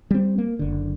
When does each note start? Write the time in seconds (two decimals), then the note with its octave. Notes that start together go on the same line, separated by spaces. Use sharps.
0.11 G3 C4
0.38 A#3
0.59 F#1 D3